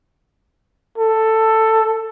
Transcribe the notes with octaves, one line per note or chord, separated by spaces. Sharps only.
A4